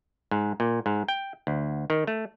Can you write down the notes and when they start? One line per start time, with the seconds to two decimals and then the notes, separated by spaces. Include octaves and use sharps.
0.31 G#2
0.60 A#2
0.86 G#2
1.08 G5
1.47 D2
1.90 D#3
2.07 A3